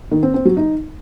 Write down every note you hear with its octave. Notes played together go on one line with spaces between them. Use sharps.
D#3
C4
C4
F#3
D#4